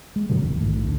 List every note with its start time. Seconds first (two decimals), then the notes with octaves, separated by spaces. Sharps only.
0.16 G#3
0.29 G2 B2 D3 F#3
0.42 F1 C2 D#3
0.60 A#1 G#2 A3
0.84 D2 C#4 D4